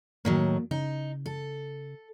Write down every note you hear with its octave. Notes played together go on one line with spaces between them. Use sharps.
A2 D#3 F#3 A#3
C#3 D#4
A4